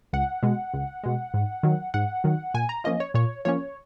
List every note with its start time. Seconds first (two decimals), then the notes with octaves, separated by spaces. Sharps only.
0.13 C#2 F#5
0.43 B2 G#3
0.74 C#2
1.03 B2 G#3
1.34 G#2
1.63 D#3 F#3
1.94 G#2 F#5
2.24 D#3 F#3
2.54 A#2 G#5
2.69 A#5
2.84 F3 A#3 C#4 D#5
3.00 C#5
3.14 A#2 C#5
3.45 F3 A#3 C#4 C#5